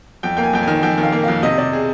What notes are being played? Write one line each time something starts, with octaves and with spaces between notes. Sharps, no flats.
F2 G5
A#3 G5
G#5
F2 G5
D#3 G#5
F2 G5
D#3
F5
A#3
F2 F5
C3 D#5
C3 D5
G#4